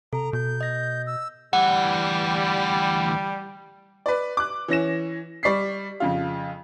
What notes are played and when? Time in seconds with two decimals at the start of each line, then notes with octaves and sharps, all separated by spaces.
0.13 C3 A4 A#5
0.33 B2 G6
0.61 D#5 A#6
1.07 E6
1.53 D2 E3 G3 F#5
4.06 B4 D5
4.37 D6 F#6
4.68 E3 C#4 A#6 E7
5.43 G3 D5 C#6 B6 C7
6.00 F2 C#3 F4